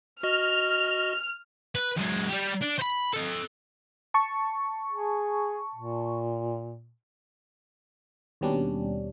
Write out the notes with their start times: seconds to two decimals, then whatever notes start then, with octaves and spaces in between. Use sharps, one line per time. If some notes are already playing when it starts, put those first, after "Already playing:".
0.23 F#4 D#5 F6
1.75 B4
1.97 F#2 G#3
2.29 G3 G4
2.61 D4
2.78 C5 B5
3.13 A4 D#5
4.14 A5 C#6
4.91 G#4
5.75 A#2
8.41 D#2 B2 G3 C#4 D4